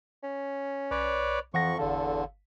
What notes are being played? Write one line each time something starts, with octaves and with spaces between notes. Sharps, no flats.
C#4
B1 B4 C#5 D5
F2 E3 F3 F#5 C#6 A#6
G1 E2 D3 A4 F5